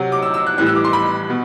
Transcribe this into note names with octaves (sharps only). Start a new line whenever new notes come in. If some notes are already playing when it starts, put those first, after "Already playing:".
Already playing: C3 F#3
D6
E6
E6
F#6
A2 E3 G3 F#6
E6
D6
C6
B5
B2